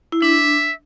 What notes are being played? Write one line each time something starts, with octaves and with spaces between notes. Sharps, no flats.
E4
D4 E5